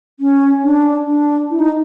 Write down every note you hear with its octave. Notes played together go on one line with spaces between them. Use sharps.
C#4
D4
D4
E4
D#4